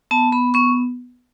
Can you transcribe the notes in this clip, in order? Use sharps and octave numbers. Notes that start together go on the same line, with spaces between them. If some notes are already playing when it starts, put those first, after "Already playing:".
B3 A5
B3 B5
B3 C#6